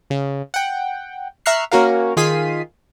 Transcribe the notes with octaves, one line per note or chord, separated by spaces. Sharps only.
C#3
F#5 G5
E5 A#5 C#6 F6 F#6 C7
A#3 C#4 F#4 A#4 F5
D#3 F4 G#4 B6 C7 D#7